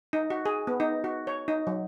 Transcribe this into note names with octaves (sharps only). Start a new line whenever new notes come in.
D#4
F#4
G#4
B3
D#4
F#4
C#5
D#4
F#3